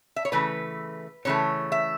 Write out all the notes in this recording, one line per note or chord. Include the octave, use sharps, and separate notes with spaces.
E5
C#5
C#3 E3 A3 B4
C#3 E3 A3 C#5
E5